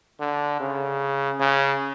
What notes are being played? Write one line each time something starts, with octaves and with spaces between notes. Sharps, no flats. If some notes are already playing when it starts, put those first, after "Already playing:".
D3
C#3
C#3